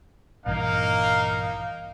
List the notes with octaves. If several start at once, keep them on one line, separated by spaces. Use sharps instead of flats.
A#1 G2 E3 A#3 D#4 F5